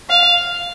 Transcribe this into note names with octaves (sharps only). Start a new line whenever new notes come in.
F5